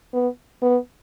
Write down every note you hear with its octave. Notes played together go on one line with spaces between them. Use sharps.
B3
B3